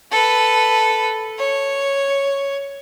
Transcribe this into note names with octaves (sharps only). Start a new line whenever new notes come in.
A4 B4
C#5